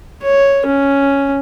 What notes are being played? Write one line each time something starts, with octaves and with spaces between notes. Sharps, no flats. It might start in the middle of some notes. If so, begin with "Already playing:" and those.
C#5
C#4